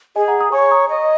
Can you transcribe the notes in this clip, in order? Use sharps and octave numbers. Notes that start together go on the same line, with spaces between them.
G#4 D#5 G#5
F#5 A#5
A#5 D#6
C#5 G#5 C#6
A#5 D#6
D#5